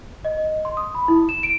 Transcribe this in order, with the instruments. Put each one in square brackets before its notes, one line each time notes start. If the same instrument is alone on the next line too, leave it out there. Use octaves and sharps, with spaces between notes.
[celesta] D#5
C6
D#6
B5
E4
E7
D7